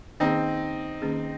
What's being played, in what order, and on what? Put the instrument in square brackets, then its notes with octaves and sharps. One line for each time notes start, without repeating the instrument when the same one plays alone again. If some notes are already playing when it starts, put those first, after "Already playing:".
[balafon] D#3 A#3 C#4 G#4 [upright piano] C4 D#4
[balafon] D#3 A#3 C#4 G#4